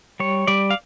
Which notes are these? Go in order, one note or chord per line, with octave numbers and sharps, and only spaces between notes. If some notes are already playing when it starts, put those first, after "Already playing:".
G3 C#5
G3 D5
F5